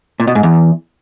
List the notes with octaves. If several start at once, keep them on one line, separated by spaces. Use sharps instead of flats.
A#2
B2
G#2
E2